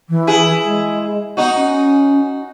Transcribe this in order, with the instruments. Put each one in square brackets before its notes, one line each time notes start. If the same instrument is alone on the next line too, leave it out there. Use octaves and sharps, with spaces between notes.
[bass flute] E3
[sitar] E4 G#4
[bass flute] G#3
[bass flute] B3 [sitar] D#4 F#4
[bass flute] C#4